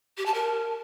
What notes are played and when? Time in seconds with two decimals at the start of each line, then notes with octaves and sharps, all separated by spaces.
0.17 G4
0.26 A5
0.34 A#4